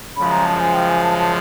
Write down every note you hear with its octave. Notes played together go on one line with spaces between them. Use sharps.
F#2 C#3 F3 G#3 B5
A#5
A5
G#5
G5
G#5
A5
A5